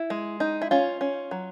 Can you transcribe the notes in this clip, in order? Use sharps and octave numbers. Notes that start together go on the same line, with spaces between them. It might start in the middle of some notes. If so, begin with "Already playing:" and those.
Already playing: E4
G#3
D#4
E4
C#4 F4
C#4
F#3